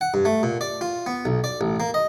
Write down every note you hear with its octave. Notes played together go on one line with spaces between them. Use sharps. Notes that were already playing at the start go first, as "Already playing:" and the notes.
F#5
G2
A3
A#2
D5
F4
B3
B1
D5
A1
A#3
D#5